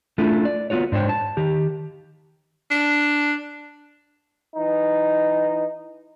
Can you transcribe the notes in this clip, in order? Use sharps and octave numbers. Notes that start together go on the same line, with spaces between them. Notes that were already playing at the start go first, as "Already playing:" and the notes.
A3 D4 E4 F4 A4
D5
B3 C4 F4 F#4 C#5
G#2 D4 C5 C#5 G5
A5
D#3 G4
D4
E3 D#4